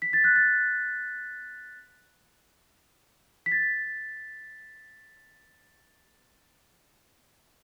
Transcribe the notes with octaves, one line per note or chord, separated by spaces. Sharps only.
B6
A6
F#6
A6
B6
A6